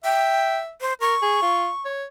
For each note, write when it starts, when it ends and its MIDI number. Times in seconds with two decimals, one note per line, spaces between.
0.04 0.72 76
0.04 0.56 79
0.81 0.93 72
1.01 1.15 70
1.01 1.83 85
1.22 1.38 68
1.42 1.68 65
1.85 2.05 73